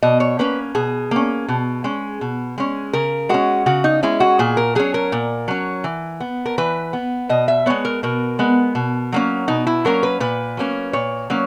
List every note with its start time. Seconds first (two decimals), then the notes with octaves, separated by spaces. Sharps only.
0.03 B2 D#5
0.20 C#5
0.39 A#3 C#4 B4
0.75 B2 G#4
1.11 A#3 C#4
1.49 B2
1.84 G#3 C#4
2.21 B2
2.58 G#3 C#4
2.93 C#3 A#4
3.29 G#3 C#4 F#4
3.66 C#3 F#4
3.84 D#4
4.03 G#3 C#4 E4
4.20 F#4
4.39 A#2 G#4
4.57 A#4
4.75 F#3 C#4 G#4
4.94 A#4
5.12 A#2
5.48 F#3 C#4
5.84 E3
6.20 B3
6.46 A#4
6.58 E3 B4
6.93 B3
7.29 B2 D#5
7.48 E5
7.66 G#3 B3 C#5
7.85 A#4
8.03 B2 A#4
8.39 G#3 B3
8.75 B2
9.12 F#3 A#3 C#4
9.48 B2 D#4
9.67 E4
9.85 F#3 A#3 C#4 A#4
10.03 B4
10.20 A#2 B4
10.57 F#3 A#3 C#4
10.93 A#2 C#5
11.30 F#3 A#3 C#4